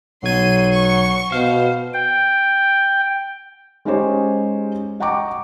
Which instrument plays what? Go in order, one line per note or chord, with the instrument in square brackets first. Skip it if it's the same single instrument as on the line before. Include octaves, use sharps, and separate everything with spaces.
[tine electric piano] B1 G#6 [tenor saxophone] F#3 [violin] C6 D#7
[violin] C#6
[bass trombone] B2 [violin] C5 [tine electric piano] F5
[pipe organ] G5
[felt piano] G#3 C#4 D#4 G4 C5 C#5
D#5 F#5 G5 A#5 C#6 D6